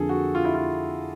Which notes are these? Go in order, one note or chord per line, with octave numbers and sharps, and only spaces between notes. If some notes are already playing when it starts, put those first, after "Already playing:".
Already playing: F2 D3 F3 A#3 D4 G#4 A4
F#4
F4
E4
F4